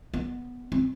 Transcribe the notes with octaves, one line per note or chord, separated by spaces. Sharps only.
B3
C4